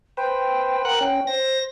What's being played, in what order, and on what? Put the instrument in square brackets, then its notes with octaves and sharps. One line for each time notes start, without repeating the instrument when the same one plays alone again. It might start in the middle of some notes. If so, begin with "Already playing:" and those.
[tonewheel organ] B4 C5 [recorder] G5
[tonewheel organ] A#4 F#5 F#6
[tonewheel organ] C#4 [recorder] G5
[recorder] C5 [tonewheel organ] A#6